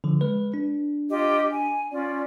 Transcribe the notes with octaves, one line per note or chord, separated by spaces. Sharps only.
D3 F3
G#3 B4
D4
F4 G4 D#5
G#5
C#4 F4 D5